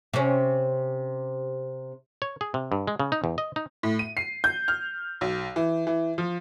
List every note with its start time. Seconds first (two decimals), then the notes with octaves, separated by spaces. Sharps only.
0.14 C3 C#4
2.22 C#5
2.41 G#4
2.54 C3
2.72 G2
2.87 G#3
3.00 C#3
3.12 D#4
3.24 E2
3.38 D#5
3.56 D#4
3.83 A2
3.99 D#7
4.17 C7
4.44 G6
4.68 F6
5.21 B1
5.56 E3
5.87 E3
6.18 F3